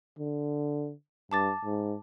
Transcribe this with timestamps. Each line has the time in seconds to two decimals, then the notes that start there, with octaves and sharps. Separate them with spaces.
0.19 D3
1.32 G2 A5 D6 A6
1.65 G#2